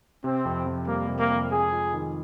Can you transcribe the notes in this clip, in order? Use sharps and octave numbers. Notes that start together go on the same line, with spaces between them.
C3 C4
F2
F2
G3 A#3
C3
A#3
F2
G#3 G#4
F4
D#3